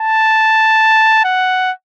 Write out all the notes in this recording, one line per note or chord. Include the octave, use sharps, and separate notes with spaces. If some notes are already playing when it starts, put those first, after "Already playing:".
Already playing: A5
F#5